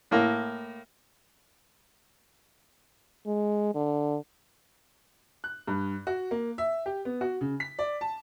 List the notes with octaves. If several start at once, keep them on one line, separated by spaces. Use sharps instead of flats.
A2 A#3
G#3
D3
F#6
G2
F#4
A#3
E5
G4
B3
F#4
C#3
B6
D5
A5